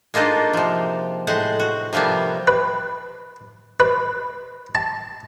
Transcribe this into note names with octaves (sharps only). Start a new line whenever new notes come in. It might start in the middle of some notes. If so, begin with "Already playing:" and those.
G#3 A#3 D4 D#4 F4
C3 F3
A2 G#3 C5 F#5
F#4
C3 F3 G3 A#3 B3
B4
B4
A5